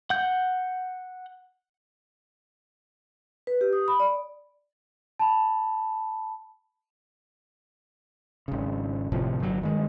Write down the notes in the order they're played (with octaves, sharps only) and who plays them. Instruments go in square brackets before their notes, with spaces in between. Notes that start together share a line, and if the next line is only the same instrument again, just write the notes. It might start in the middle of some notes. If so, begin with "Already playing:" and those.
[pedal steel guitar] F#5 G6
[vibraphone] B4
G4
D#6
B5
D5
[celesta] A5 B5
[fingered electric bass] G#1 C#3
G1 A2 C3 F3
G1 F#3
G2 D#3 G#3